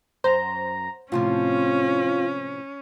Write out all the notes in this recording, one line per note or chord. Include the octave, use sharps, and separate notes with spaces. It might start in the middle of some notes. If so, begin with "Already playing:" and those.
F#2 C5 A#5
A2 C3 F3 C#4 F4